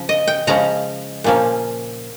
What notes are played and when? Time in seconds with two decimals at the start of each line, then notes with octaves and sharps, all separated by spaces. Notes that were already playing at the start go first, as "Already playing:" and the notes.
Already playing: C#3 F3 C#4
0.09 D#5
0.27 G5
0.47 C#3 F3 G#3 C#4 A#5
1.24 A#2 F3 A#3 C#4